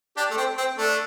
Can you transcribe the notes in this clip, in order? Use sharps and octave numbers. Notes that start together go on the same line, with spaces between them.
D4 G4
A3
C4
C4
A3 D4